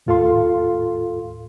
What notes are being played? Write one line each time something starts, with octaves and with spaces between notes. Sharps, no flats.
D#2 A2 F4 A4 F5 C6